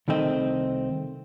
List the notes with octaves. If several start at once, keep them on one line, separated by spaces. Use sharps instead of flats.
C2 D#3 A3 C4 D#5